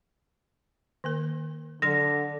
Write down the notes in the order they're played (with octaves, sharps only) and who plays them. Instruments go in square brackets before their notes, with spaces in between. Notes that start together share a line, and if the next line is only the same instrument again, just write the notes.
[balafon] D#3 A#3 A#4
[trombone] D3 [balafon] F#3 A4 C6 [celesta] A#6